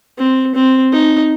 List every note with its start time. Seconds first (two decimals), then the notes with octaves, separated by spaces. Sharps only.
0.18 C4
0.55 C4
0.93 D#4